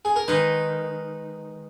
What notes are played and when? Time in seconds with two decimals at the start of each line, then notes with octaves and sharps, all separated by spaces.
0.05 G#4
0.16 A#4
0.28 D#3 G#3 D#4 B4